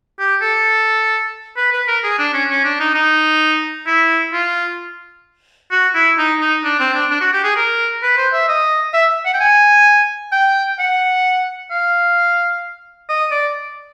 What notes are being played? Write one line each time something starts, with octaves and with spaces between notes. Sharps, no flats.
G4
A4
B4
B4
A#4
G#4
D4
C#4
C#4
D4
D#4
D#4
E4
F4
F#4
E4
D#4
D#4
D4
C4
D4
D4
F#4
G4
G#4
A#4
B4
C5
E5
D#5
E5
F#5
G5
G#5
G5
F#5
F5
D#5
D5